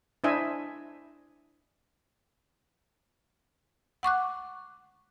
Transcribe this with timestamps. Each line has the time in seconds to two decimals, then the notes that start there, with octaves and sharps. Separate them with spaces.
0.24 D4 E4 C5 D#5 E5 G#5
4.03 F#5 C#6 D6 F#6